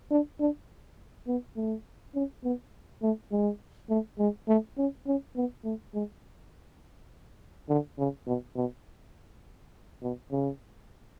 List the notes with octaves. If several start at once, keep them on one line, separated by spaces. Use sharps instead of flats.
D4
D4
B3
A3
C#4
B3
A3
G#3
A3
G#3
A3
C#4
C#4
B3
A3
G#3
D3
C#3
B2
B2
B2
C#3